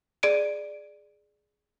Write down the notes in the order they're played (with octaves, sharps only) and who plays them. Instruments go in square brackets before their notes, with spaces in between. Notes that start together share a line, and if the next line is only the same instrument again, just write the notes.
[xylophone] G#4 D5 D7 D#7